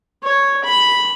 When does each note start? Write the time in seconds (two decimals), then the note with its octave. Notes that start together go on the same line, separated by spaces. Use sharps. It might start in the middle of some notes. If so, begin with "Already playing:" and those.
0.23 C#5
0.64 B5